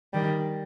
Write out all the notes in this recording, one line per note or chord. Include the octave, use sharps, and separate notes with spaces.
D#3 G3